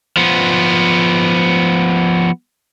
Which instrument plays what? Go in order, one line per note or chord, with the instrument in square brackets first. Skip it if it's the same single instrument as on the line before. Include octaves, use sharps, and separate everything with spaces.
[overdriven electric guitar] F3 B3